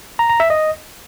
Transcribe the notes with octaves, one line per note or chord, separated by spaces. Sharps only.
A#5
A#5
E5
D#5